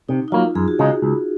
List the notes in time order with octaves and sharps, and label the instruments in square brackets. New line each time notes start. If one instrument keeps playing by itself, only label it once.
[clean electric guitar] C3 [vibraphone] D#4
[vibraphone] D#4
[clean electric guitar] F#3 A#3 [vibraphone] F4
[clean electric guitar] F#2 [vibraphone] G#4
[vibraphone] F#4
[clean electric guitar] C#3 G#3 D#4 [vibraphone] G#4
[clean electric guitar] C#2